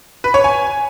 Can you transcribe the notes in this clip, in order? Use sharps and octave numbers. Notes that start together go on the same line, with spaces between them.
B4
C#5
G#5